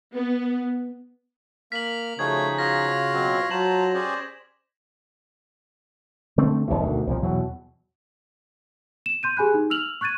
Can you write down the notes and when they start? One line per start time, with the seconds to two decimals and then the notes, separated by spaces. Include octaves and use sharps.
0.14 B3
1.72 A#3 F6 B6 F#7
2.19 C#3 F3 A3 D#4 F#4 G#4 C#5 G#6
2.58 F4 F#4 F5 A#6
3.14 B2 F#3 C4
3.51 F#3 F4 C5 A5 A#5 E7 F#7
3.94 C#4 G4 G#4 C5 D5
6.38 D3 A3 C4
6.68 F#1 D2 C3 E3
6.81 D2 B2 D3 D#3
7.07 C2 A#2 F3
7.23 E2 B2 F#3
9.06 E7
9.23 C6 G6 D#7
9.37 G4 G#4 G#5 B5 F#6
9.54 D#4
9.70 E6 F6 F7 F#7
10.01 C#6 F#6 G#6 A6 D#7